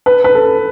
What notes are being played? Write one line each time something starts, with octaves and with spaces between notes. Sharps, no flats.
B4
B4
A4